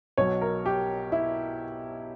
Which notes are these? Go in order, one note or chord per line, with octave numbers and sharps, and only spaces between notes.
B1 B2 F#3 C#5
A#4
G4
E4